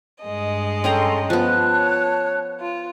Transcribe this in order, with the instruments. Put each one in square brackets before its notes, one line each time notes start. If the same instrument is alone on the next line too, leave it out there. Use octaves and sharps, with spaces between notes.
[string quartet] G2 G#3 D#5
[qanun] C#4 G5 A#5 [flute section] A4 C6
[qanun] F3 B3 [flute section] A5 F#6
[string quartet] C#5
F4